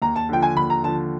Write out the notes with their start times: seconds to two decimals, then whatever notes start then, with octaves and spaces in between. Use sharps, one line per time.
0.02 D#2 A#5
0.16 A5
0.29 D3 F3 G5
0.42 G#5
0.56 D#2 B5
0.70 A#5
0.83 D3 F3 A5